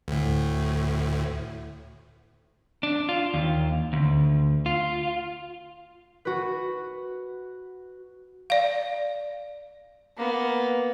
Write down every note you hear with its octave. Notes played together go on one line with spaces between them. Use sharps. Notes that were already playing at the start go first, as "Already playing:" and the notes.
D2 A2
D4
F4
D#2
D2
F4
F#4 B4
D5 F5
A#3 B3